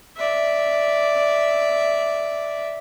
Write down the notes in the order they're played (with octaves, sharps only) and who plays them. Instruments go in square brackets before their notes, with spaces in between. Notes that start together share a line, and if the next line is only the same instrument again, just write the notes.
[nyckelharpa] D5 E5